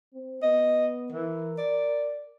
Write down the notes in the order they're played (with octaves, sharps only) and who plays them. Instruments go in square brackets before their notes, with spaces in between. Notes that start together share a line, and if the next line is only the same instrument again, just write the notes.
[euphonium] C4
[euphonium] B3 [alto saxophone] D#5
[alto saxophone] E3 [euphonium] A#4
[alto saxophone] D5